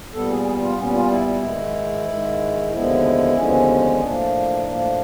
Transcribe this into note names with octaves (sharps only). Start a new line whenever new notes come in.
A#2 G3 B3 A4
G#4
F4
A#2 G3 B3 C#4
F4
E4
E4
G#2 D#3 G#3
G#2 D#3 G#3
D#2 D3 F3 G#3 B3 E4
D#2 D3 F3 G#3 B3 C#4
A2 F3 A#3 D4
A2 F3 A#3